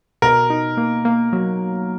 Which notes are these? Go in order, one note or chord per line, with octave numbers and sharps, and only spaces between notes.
B2 A#4
D#4
A#3
A#3
F#3